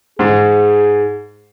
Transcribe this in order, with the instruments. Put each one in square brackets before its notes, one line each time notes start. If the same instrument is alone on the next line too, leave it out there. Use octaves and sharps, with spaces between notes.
[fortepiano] G#2 [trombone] G#4